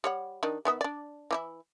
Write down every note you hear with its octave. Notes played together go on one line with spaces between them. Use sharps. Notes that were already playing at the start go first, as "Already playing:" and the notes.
G3 C#5 F#5
D#3 D4 D#4
D#3 B3 E5
D4 D5
E3 D#4 E4